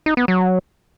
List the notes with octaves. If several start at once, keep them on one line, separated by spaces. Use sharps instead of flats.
D#4
B3
F#3